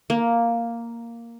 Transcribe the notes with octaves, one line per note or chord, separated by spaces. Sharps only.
A#3